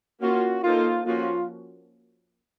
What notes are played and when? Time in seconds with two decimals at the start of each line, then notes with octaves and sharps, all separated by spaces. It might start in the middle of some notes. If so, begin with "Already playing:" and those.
0.22 A#3 C#4 F4 F#4
0.64 A#3 D#4 F4 A4 C5
1.06 F3 A#3 C#4 F4 F#4